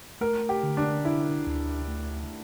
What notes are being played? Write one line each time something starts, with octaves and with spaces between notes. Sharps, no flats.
A3 A#4
G4
D3
D4
D4 E4
D2
A3